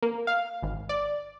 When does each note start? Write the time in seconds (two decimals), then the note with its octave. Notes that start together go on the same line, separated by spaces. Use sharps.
0.03 A#3
0.27 F5
0.63 G#1
0.89 D5